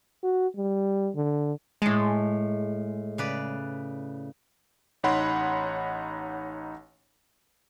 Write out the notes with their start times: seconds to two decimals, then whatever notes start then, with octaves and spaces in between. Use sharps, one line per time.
0.23 F#4
0.56 G3
1.15 D3
1.82 A2 G#3 A5
3.18 C#3 B4 D5
5.03 A1 D#4 C#5 F#5 B5 C6